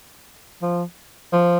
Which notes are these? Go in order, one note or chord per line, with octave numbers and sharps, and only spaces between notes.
F3
F3